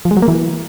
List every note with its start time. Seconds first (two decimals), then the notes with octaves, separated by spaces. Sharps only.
0.05 F3
0.11 G#3
0.17 F#3
0.22 A#3
0.28 E3